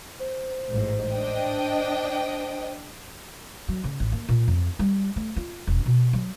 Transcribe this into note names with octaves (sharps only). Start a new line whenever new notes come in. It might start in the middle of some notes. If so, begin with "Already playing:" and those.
C5
A1 G#2
D4 D#5 G5
F#3
C#3
A1
A#3
A#2
F2
G3
A3
F4
E1
B2
F#3